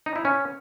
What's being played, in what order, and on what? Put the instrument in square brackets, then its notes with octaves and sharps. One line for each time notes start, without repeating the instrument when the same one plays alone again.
[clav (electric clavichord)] D#4
E4
C#4